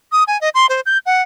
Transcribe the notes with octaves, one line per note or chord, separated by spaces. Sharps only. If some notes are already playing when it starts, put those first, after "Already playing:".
D#6
G#5
D#5
C6
C5
G6
F#5